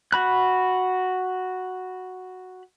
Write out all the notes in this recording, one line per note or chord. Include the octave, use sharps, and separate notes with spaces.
F#4 B5 F#6